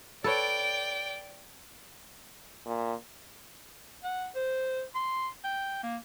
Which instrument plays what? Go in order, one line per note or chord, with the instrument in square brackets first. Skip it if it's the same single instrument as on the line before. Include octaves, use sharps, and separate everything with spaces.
[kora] A4 B4 C#5 [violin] D5 G5
[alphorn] A#2
[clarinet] F#5
C5
C6
G5
A#3